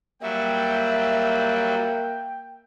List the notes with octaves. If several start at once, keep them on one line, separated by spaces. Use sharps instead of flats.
F#3 G3 A#3 F#4 E5 G5